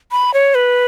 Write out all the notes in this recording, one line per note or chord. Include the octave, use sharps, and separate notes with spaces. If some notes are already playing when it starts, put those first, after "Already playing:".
B5
C#5
B4